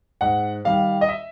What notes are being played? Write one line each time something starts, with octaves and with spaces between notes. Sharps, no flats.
G#2 F#5
D#3 G3 F5
D#5
E5